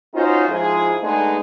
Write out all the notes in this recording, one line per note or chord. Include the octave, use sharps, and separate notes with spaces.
C#4 D#4 F4 F#4 C5
G#2 F3 G#3 E4 F4 G#4
G#3 A3 B3 D4 D#4 G#4